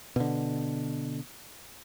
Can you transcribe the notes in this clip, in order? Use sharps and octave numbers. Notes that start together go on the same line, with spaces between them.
B2 D3